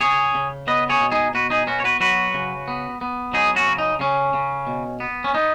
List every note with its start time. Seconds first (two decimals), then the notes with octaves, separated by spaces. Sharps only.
0.01 C#3 G#4 C#5
0.35 C#3
0.67 B3 B4 D#5
0.90 G#4 C#5
1.01 B2
1.12 D#4 G#4
1.34 B2 F#4 B4
1.50 D#4 G#4
1.67 B3 C#4 F#4
1.80 C#5
1.84 F#4 B4
2.00 F#3 F#4 B4
2.34 C#3
2.68 B3
3.01 B3
3.33 F#3 D#4 G#4
3.56 C#4 F#4
3.68 C#3
3.78 D#4
4.00 C#3 C#4
4.34 C#3
4.67 B2
5.00 B3
5.24 C#4
5.34 B3 D#4